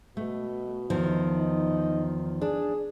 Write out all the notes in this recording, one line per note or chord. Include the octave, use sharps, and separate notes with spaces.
B2 A3
E2 D#3 F3
D#4
D4 G#4